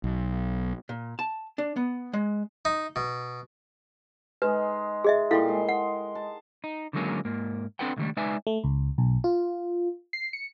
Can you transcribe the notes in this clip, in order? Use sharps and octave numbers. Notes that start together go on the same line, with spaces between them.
B1
A#2
A5
D4
B3
G#3
D#4
B2
G#3 D#4 B4
G#4 D#5 E5
A#2 G3 E4 A4 F5 C6
G#3
F#5
A5
D#4
D3 D#3 F#3 G#3 A#3 C#4
G#2 A#3
C4 D4 A4 B4 F#5 G5
C#2 D3 D#3 F#3 G3 A3
G#3 D#4 B4 D5 E5 G#5
A3
C#2
B1
F4
C7
C#7